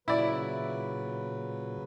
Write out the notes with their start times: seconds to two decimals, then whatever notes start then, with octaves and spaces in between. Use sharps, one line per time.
0.08 A#2 C#3 F#3 E4 B4 D5